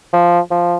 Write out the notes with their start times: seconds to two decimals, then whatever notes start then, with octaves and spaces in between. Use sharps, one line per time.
0.13 F3
0.51 F3